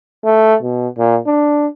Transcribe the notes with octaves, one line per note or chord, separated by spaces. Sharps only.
A3
B2
A#2
D4